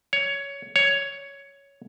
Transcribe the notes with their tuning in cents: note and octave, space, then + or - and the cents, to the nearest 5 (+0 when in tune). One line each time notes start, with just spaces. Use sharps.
C#5 +15
C#5 +10